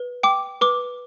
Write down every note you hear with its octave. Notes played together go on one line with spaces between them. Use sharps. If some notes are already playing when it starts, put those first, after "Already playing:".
Already playing: B4
G5 D6
B4 D6